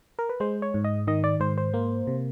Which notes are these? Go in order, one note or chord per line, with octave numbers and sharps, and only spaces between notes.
A#4
B4
G#3 C5
C#5
G#2
D#5
D#3 D#5
D5
G#2 C5
C5
A#3
C3